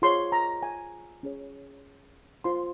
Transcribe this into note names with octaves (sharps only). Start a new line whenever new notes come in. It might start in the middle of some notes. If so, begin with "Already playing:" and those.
F4 G#4 C#5 C6
A#5
G#5
C#4 G#4 C#5
F4 C5 C6